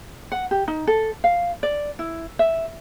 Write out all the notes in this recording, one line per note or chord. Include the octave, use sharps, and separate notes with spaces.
F#5
G4
D#4
A4
F5
D5
E4
E5